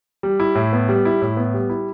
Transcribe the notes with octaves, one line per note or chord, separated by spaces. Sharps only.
G3
E4
A2
B3
G3
E4
A2
B3
G3
E4